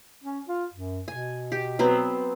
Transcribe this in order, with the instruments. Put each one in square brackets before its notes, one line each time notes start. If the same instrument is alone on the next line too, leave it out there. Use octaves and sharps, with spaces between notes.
[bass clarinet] C#4
F4
F#2
[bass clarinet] B2 [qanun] G#5
[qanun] G4
F#3 B3 C4